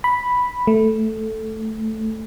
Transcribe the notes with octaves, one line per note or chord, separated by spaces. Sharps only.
B5
A3